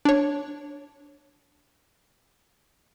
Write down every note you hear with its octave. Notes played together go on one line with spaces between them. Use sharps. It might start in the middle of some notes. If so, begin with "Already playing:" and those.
D4 C#5